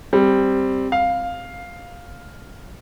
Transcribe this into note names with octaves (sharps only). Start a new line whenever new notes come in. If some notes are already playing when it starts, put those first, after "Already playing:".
G3 C4
F5